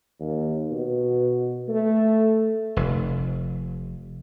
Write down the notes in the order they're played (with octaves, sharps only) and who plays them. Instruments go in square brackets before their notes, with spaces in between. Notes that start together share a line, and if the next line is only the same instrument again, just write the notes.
[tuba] D#2
B2
A3
[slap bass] F1